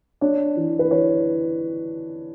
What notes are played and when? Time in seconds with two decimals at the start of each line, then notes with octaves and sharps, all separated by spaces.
0.21 D4 C#5
0.57 E3
0.79 B4
0.91 E3 C#5